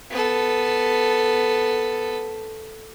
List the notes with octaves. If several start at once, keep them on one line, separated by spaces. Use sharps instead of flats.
B3 A4